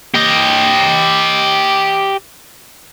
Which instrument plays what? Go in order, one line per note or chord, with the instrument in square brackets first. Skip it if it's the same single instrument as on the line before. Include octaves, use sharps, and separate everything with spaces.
[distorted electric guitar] G4 D#5